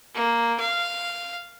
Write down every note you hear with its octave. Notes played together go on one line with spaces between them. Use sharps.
A#3
F5